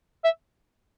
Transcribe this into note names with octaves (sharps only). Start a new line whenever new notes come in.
E5